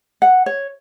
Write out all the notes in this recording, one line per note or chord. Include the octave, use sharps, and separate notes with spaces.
F#5
C#5